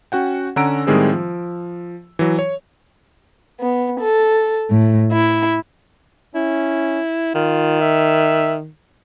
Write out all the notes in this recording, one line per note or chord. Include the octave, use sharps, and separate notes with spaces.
C#4 F#4 F#5 G5
D3 C#4 F#5 A#5 E6 D7
A2 D#3 G3 G#3 C4 G#4
F3
E3 F#3
C#5
B3
A4
A2
E4
C#4 E4
D#3 F4
E5